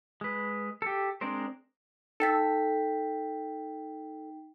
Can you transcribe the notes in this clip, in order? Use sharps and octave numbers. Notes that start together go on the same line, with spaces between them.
G#3 B4
G4 A4
G#3 C4 D4 A#4 C5
D#4 A4 G5 B6